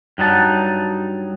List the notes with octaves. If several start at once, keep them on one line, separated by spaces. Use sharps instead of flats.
G2 F#3 D#4 A5